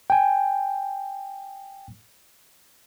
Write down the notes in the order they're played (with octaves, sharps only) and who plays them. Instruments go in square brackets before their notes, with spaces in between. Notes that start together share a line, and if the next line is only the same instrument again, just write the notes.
[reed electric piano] G5 G#5